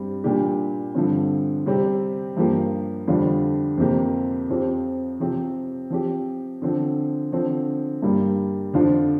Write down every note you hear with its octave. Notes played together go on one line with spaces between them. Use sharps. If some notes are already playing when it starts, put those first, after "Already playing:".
Already playing: G2 G3 C4
A#2 G3 D4 G4
G2 D3 F3 C4
C3 G3 C4 G4
G2 F3 A#3 G4
F2 D3 G3 D4 F4
F2 C3 A#3 G4
F2 F3 C4 G4
C3 F3 C4 G4
F3 C4 G4
D3 F3 C4
D3 F3 C4
G2 G3 A#3
F2 D3 F3 D4 F4